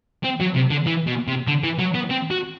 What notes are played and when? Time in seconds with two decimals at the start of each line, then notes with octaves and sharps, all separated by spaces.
0.24 C4
0.40 F#3
0.55 C3
0.70 D3
0.86 E3
1.07 B2
1.27 C3
1.47 D3
1.63 E3
1.79 F#3
1.94 B3
2.10 C4
2.30 F#4